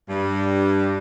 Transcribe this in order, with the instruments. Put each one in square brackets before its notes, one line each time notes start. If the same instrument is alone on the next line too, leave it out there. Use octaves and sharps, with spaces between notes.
[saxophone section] G2